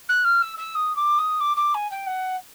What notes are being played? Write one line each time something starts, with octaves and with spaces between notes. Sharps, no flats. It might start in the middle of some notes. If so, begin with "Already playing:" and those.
F#6
F6
E6
E6
D#6
D6
D#6
D6
D6
G#5
G5
F#5